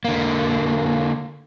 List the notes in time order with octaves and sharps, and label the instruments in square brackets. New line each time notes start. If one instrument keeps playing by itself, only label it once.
[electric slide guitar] D3 A#3